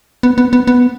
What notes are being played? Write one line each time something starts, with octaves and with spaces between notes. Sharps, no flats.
B3
B3
B3
B3